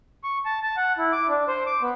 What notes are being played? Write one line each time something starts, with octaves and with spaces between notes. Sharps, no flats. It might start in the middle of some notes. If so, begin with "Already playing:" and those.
C#6
A5
A5
F#5
E4
D6
D4
C5
D6
B3